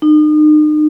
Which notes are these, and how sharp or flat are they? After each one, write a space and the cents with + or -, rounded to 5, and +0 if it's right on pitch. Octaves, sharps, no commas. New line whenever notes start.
D#4 -40